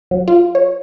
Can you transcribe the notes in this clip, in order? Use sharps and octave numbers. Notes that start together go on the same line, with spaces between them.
F#3
F4
C#5